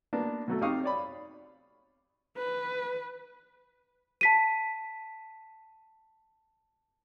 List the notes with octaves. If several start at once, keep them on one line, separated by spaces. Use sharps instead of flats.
A#3 B3 D4
B2 F#3 A3
F2 D#4 G4 F5 C#6 D#6
C#5 D5 B5
B4
A5 B6 D#7